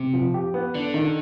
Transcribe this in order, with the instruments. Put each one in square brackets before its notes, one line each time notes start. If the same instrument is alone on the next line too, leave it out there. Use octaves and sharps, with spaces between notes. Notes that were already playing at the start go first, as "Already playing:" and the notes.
Already playing: [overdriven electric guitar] C3
[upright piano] F3
G4
B3
[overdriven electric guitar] D3 [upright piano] D4
[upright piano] D#3